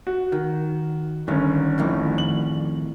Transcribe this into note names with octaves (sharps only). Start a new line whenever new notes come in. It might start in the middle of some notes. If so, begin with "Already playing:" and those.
F#4
D#3
G1 D#3 C#4
F2 A2 D#3
F#7